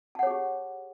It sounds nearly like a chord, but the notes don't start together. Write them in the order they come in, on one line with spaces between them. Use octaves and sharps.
A5 F#5 C#5 G#4 G4